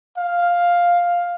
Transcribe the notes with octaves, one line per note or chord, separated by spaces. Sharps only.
F5